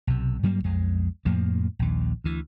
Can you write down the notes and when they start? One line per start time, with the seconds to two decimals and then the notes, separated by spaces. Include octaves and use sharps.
0.07 B1 C3
0.43 G2 F#3 G3 A#3
0.64 B1 F2 G#3
1.25 F2 A2 F3 A#3
1.79 A#1 D#2
2.24 D2 E3